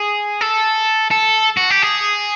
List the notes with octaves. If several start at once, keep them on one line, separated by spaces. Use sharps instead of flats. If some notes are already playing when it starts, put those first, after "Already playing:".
Already playing: G#4
A4
A4
F#4
G4
G#4